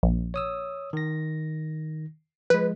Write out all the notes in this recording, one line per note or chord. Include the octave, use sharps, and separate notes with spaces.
A#1
C#5 D#6 E6
D#3 A#6
F3 G#3 B4